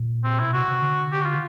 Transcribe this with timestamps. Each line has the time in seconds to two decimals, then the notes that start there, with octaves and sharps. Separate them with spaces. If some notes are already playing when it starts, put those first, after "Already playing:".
Already playing: A#2
0.24 C4
0.40 B2 E4
0.53 C3 F#4
0.68 C3
0.82 D3
1.12 G4
1.22 F#4
1.26 F4